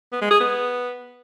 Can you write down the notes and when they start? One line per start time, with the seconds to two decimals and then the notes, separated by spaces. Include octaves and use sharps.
0.12 B3
0.22 G#3
0.31 G#4
0.40 B3